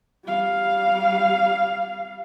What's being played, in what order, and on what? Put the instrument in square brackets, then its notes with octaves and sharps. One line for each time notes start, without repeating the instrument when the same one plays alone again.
[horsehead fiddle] G3 F5